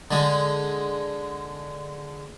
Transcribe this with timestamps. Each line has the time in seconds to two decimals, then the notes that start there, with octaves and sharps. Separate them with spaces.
0.11 D3 G#3